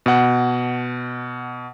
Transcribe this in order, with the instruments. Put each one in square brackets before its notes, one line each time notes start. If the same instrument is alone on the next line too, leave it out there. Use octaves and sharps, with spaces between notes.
[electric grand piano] B2 F#5